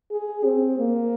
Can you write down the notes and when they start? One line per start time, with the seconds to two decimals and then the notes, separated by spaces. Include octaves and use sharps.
0.12 G#4
0.45 C4
0.79 A#3